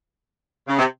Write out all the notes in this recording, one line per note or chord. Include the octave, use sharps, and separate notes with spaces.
C#3
C3